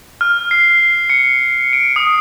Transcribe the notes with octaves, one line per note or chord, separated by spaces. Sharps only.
F6
C7
C#7
D7
D#6